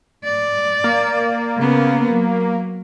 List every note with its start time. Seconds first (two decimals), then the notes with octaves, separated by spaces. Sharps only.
0.24 D5
0.84 A#3
1.57 C#3 B3
2.10 F#3